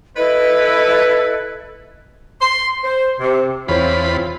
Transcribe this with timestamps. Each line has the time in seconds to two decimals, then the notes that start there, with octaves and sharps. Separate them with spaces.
0.17 E4 A4 B4 D#5
2.41 C6
2.83 C5
3.20 C3
3.68 E2 C4 E4 F4 C5 C#5 B5